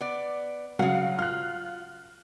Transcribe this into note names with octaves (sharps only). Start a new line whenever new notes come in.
B3 D5
C#3 F#3 F5 F#5
F4 F6 F#6